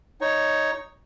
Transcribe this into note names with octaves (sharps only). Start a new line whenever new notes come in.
D#4 C#5